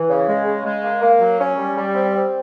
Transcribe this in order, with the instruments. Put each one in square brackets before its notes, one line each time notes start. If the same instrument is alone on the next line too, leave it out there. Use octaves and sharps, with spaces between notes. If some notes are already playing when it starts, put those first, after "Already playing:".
Already playing: [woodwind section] E3
C#3
G#3
C#3
G#3
A#3
A#3
F#3
C#4
G3
G3
C4
C4